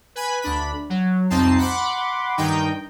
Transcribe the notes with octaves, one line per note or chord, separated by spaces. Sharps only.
B4 G#5 B5
D2 D4 B5
F#3
C2 F2 C4 D#4 A5 C7
F#5 B5 C6 D6
G2 D#3 D#4 G5